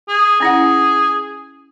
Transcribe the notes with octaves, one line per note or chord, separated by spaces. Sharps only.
G#4
C#4 E4 G#4 F#5